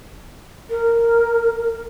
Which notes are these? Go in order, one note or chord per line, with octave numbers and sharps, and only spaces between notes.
A#4